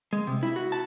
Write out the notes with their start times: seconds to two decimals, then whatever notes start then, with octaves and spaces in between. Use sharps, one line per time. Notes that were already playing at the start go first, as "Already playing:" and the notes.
0.13 G#3
0.27 C3
0.43 E4
0.56 F#4
0.72 A5